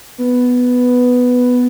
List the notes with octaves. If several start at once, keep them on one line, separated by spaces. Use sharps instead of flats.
B3